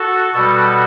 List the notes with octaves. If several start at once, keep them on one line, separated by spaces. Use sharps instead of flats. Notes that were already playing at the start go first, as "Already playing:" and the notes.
Already playing: F#4 A4
B2 G3 F#4 A4